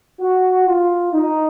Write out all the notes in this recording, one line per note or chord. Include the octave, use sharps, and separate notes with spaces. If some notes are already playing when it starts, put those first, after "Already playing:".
F#4
F4
D#4